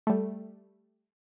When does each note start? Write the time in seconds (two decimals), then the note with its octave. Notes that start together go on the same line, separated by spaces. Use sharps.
0.07 G3 A3